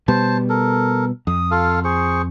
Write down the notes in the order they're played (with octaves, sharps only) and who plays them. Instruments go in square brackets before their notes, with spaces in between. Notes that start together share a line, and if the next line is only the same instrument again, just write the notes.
[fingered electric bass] B2 G3 B3 [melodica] C5 A5
[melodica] A4 A#4
[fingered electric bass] F2 [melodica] D#6
[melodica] F4 A4 F5
G#4 C5 C#6